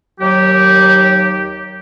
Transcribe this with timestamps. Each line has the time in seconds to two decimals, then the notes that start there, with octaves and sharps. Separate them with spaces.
0.20 D#2 F#3 G4